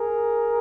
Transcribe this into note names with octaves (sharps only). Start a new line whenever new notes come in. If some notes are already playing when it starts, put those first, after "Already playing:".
Already playing: G#4 A#4